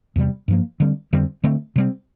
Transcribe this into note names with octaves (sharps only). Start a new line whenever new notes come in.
E2 C3 G3
G2 F3 A#3
D3 G3 C4
F2 D3 G3 C4
D3 A3 C4
C3 G3 C4